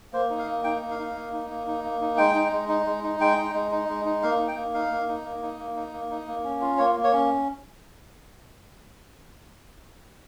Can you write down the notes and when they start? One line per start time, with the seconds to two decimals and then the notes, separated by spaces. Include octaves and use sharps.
0.13 A#3 C5
0.30 D#4
0.39 F5
0.47 A#3
0.64 D#4 G5
0.81 A#3
0.91 F5
0.99 D#4
1.15 A#3
1.33 D#4
1.50 A#3
1.67 D#4
1.84 A#3
2.01 D#4
2.17 G#3 G5
2.35 D#4
2.52 G#3
2.69 D#4
2.86 G#3
3.04 D#4
3.20 G#3 G5
3.37 D#4
3.54 G#3
3.71 D#4
3.89 G#3
4.05 D#4
4.23 A#3 F5
4.39 D#4
4.48 G5
4.56 A#3
4.74 D#4 F5
4.91 A#3
5.08 D#4
5.25 A#3
5.42 D#4
5.59 A#3
5.76 D#4
5.93 A#3
6.11 D#4
6.28 A#3
6.44 C#4
6.61 F4
6.78 A#3 C#5
6.95 A#3
7.04 C#5
7.13 C#4